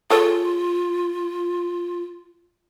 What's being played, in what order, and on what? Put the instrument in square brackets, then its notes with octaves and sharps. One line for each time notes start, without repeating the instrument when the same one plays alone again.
[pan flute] F4 [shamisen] G#4 A4 C#5